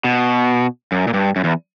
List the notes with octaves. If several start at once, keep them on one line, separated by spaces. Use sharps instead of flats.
B2
F#2
A#2
G2
F#2
E2